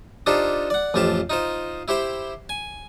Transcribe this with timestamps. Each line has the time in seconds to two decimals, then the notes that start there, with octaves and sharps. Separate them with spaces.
0.26 D4 D#4 F4 G4 A4 C5
0.70 D5 F#5
0.94 A1 F2 F4 G4 C5 A5
1.30 D#4 F4 C5
1.88 E4 G4 C5 G5
2.49 G#5